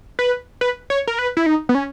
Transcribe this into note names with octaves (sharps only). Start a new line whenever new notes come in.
B4
B4
C#5
A#4
B4
E4
D#4
B3
C#4